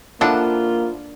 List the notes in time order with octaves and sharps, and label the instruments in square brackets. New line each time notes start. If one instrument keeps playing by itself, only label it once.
[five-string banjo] F3 E4 F#5 [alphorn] A#3 [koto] D4 A4 [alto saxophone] F4